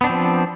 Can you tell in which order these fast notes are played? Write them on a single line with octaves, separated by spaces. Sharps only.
B3 D4 C4 F3